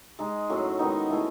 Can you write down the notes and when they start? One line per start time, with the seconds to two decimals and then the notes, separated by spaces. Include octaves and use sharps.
0.19 G#3 D#4 G#4
0.50 A2 F#3 C#4 F#4
0.79 D#3 G#3 B3 D#4
1.09 E3 A3 E4 G#4